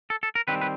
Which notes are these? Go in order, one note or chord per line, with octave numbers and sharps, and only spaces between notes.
A4
A4
A#4
D#3 G3 C4 B4
B4